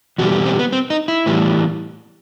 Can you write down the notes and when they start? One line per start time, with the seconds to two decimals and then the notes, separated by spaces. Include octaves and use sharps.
0.18 E2 B2 G3 F#4
0.46 C4
0.59 B3
0.73 C4
0.90 D#4
1.08 E4
1.26 A2 E3 G3 B3